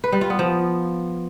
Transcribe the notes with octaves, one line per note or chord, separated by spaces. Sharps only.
B4
G3
F4
B3
F3